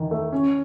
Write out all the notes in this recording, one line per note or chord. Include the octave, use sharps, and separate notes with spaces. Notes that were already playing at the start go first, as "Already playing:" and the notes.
Already playing: E2 D#3
A3
C#4